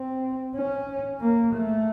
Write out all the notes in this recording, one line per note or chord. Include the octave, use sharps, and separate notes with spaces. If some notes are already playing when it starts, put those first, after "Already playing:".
Already playing: C4
C#4
A#3
A3